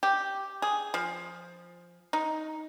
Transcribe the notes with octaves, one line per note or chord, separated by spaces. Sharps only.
G4
G#4
F3
D#4